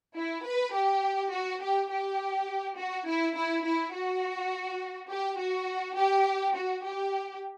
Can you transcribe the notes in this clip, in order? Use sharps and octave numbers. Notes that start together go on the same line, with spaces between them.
E4
B4
G4
F#4
G4
G4
F#4
E4
E4
E4
F#4
G4
F#4
G4
F#4
G4